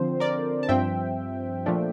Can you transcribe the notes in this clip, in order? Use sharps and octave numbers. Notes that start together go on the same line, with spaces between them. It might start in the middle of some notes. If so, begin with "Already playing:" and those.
Already playing: D3 F3 C4 C5
A#4 D5
A5
G2 F3 C4 E5 G5
A#2 F3 A3 D4